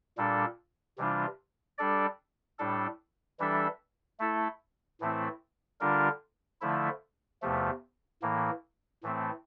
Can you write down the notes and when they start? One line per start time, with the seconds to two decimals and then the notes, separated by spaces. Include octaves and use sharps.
0.17 A#2 G3 D4 A4
0.98 C3 E3 G3 D4 F4
1.78 G3 D4 A4 D5
2.59 A2 G3 D4 A4
3.39 E3 G3 D4 A4 E5
4.20 A3 E4 A4
5.00 A2 E3 A3 C4 E4
5.81 D3 G3 D4 F4 A#4
6.61 D3 F3 A3 E4
7.42 E2 C3 F3 A3
8.22 A2 E3 A#3
9.03 A2 E3 A3 C4